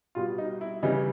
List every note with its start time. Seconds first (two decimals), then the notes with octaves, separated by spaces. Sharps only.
0.15 B2 G3 F4
0.38 D#4
0.61 E4
0.83 C#3 E3 G3 D#4